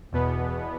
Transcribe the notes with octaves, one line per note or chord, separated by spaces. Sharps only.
E2 B2 B3